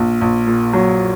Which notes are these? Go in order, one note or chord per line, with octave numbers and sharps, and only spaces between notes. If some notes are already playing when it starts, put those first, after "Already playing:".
Already playing: A#1
A#1
A#2
F#3